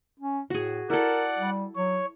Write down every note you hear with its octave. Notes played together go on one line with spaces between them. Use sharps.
C#4
A2 F#4 G#4
E4 A4 A#4 D5 F#5
G3
F#3 C#5